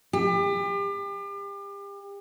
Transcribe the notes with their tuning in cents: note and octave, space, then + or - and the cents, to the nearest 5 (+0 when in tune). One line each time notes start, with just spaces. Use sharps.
G4 +35